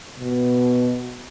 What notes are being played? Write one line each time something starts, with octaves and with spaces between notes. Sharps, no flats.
B2